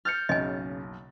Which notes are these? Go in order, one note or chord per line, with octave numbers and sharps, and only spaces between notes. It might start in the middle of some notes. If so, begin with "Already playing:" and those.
F6 G6 A6 C#7
F#1 B1 C#3 D#5 G#5